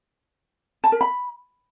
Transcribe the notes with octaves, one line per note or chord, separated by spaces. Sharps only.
A5
A#4
B5